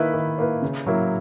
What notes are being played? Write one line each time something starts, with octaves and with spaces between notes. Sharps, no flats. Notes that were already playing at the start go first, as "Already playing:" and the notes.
Already playing: D#3 A#3 E4 B4
D#3
A#3 E4 B4
C#3
F#3 A#3 E4